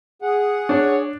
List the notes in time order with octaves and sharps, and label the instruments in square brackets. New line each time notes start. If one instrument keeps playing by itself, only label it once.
[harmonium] G#4 F#5
[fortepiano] D4 [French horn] C#5